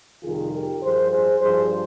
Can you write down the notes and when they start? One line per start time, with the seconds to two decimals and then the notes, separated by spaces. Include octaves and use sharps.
0.22 F2 C3 D#3 G3 F4 G#4
0.52 G4 A#4
0.81 G2 F3 G#4 C5
1.11 G#4 C5
1.41 G2 F3 G#4 C5